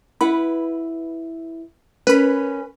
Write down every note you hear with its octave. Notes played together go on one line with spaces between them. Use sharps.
E4 B4 F#5 B5
C#4 A#4 B4 B5